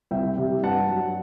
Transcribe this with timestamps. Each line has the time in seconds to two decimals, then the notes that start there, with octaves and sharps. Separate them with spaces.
0.11 C2 E5 G5
0.37 C3 E3 G3
0.63 G2 F#5 A5
0.90 F#3